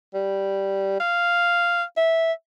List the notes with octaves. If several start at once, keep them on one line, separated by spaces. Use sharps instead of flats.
G3
F5
E5